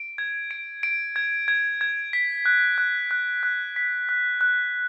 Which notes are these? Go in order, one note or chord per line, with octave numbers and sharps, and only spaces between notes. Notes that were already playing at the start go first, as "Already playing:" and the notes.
Already playing: D7
G#6
D7
D7
G#6
G#6
G#6
B6
F#6
F#6
F#6
F#6
B6
F#6
F#6